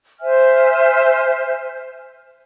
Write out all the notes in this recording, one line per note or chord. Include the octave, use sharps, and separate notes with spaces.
C5 E5 G#5 F6